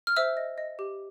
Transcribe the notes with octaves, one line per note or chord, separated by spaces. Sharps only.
F6
C5 E5 E6
D#5
D#5
G4